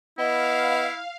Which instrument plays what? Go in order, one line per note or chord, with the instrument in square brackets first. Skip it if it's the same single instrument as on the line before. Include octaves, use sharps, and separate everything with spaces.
[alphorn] B3 [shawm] E4 [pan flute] D#5 [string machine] F5